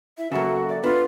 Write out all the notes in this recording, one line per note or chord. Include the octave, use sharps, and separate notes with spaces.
E4 E5
C#3 F#3 A#3 B3 F#4 A4 E5
D5 E5 A6
B3 D4 F4 B4